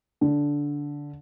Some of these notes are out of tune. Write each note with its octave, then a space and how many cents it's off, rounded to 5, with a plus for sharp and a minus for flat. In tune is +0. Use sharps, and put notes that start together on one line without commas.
D3 -10